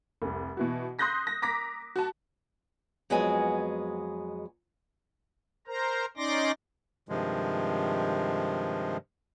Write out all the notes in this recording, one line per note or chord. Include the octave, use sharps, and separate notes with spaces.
F1 C2
B2 E3 F#4
C6 D#6 F#6 G6 A#6 B6
A#6
A#5 D6 A#6 B6
F#4 A5
F2 F#3 G#3 B3 G#4 G#5
A#4 C5 A#5
C#4 D#4 D5 C6 D6 A#6
G2 C3 D#3 F3 G#3